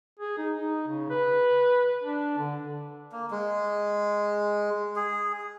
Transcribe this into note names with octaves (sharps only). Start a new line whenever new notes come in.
G#4
D#4
D#4
C#3
B4
D4
D3
A#3
G#3
G#4